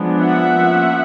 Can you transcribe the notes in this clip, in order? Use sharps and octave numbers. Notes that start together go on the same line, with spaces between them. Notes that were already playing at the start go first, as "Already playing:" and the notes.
Already playing: F3 G#3 B3 D4
E5 F#5
F3 A#3 C#4